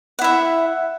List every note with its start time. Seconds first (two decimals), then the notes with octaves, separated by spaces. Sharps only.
0.19 F#5
0.21 E4
0.24 E5